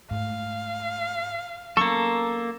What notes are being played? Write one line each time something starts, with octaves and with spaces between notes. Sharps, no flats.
G#2 A3 F5
F#3 A#3 B3 C#4 A4 C#6